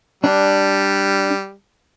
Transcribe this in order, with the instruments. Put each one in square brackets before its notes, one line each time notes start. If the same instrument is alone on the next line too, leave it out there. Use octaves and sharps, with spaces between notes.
[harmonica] G3 [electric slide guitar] D4